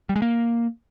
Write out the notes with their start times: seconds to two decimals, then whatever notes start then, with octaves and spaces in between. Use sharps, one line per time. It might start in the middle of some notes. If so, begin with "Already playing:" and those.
0.09 G3
0.16 G#3
0.22 A#3